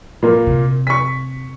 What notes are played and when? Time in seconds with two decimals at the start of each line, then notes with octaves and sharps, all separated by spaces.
0.22 A#2 A#3
0.47 C3
0.87 C#6 B6